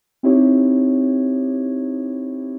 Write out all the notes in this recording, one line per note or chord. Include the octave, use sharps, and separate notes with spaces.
C4 D#4 E4 G4 C#5